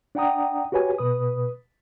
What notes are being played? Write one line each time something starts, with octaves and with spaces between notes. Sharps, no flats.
D4 D5 F#5 G5 A#5 D#6
F#4 G4 B4 C#5 G#5
B2 B4 D#6